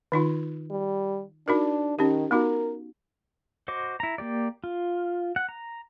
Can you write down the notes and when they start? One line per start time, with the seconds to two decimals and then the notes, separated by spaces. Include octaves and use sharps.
0.12 D#3 D#4 F4
0.71 G3
1.48 D4 D#4 F#4 A#4
1.99 D#3 C#4 D#4 G4
2.31 B3 D#4 F#4 A#4
3.68 F#4 C5 D#5 D6
4.00 E4 A#5
4.18 A#3 G4 D5
4.64 F4
5.36 F#5
5.49 A#5